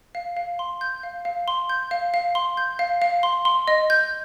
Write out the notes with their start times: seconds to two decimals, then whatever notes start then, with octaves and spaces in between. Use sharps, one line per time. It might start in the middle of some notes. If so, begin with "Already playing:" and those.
0.15 F5
0.37 F5
0.59 C6
0.81 G6
1.03 F5
1.25 F5
1.48 C6
1.69 G6
1.91 F5
2.14 F5
2.35 C6
2.57 G6
2.79 F5
3.02 F5
3.23 C6
3.45 C6
3.68 D#5
3.90 G6